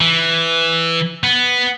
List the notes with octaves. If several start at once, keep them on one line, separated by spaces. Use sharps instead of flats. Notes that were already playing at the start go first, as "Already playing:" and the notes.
E3
B3